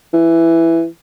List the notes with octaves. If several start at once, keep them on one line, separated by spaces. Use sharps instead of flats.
E3